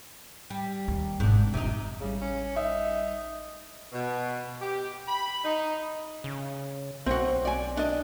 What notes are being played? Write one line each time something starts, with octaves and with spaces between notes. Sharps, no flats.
G3
D#2
G#1 G#2 B2 D4
F1 C3 F3 D#4
A1 C#3 G3
C#4
D#4 E5
B2
G4
B5
D#4
C#3
B1 C4 F#4
D5 G#5
D4 D#5